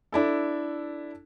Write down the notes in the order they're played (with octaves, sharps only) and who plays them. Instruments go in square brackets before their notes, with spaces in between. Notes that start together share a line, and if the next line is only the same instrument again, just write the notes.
[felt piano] D4 E4 A4